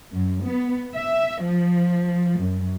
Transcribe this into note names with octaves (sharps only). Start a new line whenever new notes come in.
F#2
B3
E5
F3
F#2